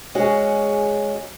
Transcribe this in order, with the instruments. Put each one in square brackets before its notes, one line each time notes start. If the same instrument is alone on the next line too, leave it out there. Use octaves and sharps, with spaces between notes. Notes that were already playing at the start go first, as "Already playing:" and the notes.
[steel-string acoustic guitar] G#3 C#4 F#4 G#4